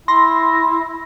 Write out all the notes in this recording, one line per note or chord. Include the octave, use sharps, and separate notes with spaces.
E4 C6 A#6